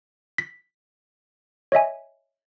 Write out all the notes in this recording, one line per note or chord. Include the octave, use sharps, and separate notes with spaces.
B6
C#5 D#5 E5 G#5